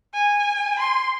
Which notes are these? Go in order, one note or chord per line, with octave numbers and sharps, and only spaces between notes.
G#5
C6